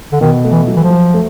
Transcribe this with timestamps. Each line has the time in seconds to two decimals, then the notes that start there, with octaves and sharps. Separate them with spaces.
0.12 D3
0.21 B2 D#3
0.44 A3
0.52 E3
0.67 F#3
0.77 E3
0.83 F3
0.90 F#3
1.14 A3